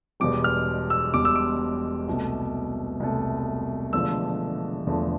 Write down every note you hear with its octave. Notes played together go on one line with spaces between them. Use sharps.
E1 E2 B2 G3 D6
F6
E6
E1 E2 B2 G3 D6
E6
D6
C2 B2 A3
C2 B2 A3
E1 E2 D3 F3 A3 E6
E1 E2 D3 F3 A3